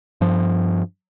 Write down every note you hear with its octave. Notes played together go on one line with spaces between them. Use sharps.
G2 F3